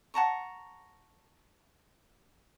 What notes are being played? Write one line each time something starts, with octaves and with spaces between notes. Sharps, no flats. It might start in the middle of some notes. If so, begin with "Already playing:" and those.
F#5 A5 A#5 C#6